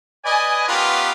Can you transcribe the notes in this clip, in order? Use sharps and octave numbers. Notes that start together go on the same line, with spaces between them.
B4 D5 D#5 G#5
B3 C#4 F4 G4 A#4 B4